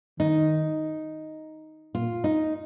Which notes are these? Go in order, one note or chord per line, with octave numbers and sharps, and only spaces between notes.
D#3 D#4
A#2 F4
D#4